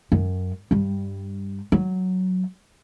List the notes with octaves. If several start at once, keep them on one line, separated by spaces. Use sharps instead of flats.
F#2
G2 G3
F#3